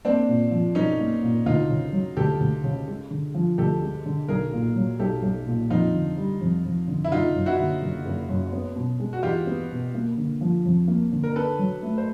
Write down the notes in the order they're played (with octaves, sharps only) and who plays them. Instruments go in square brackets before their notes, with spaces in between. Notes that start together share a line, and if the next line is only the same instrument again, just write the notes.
[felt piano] A#3 [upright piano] C4 D4
[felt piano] A#2
F3
[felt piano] B1 [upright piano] C#4 D#4
[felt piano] A#3
A#2
[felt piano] D2 [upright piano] D#4 F4
[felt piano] C#3
F#3
[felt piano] D2 [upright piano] G4 A4
[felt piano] D2
C#3
G#3
D3
F3
[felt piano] D2 [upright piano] G4 A4
[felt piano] G#3
D3
[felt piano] B1 [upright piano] G#4 A#4
[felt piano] A#2
F#3
[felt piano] B1 [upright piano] G4 A4
[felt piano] B1
A#2
[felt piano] F2 [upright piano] D#4 F4
[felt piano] D3
G3
F2
F2
D3
[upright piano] E4
[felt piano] F#1 [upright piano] D#4 F4
[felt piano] F#2
[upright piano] E4 F#4
[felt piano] D3
F#1
F#1
F#2
B3
B2
G#3
[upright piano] F#4
[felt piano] E2 [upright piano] F4 G4
[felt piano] B3
B2
A#3
D3
F3
F2
A#3
D3
[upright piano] A#4
[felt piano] D4 [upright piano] A4 B4
[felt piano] F#3
A3
[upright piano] C5